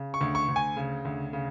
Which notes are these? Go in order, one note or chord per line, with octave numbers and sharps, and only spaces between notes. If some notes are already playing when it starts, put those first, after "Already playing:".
Already playing: C#3
C#6
D2
C#6
D2
G#5
C#3
D2
C#3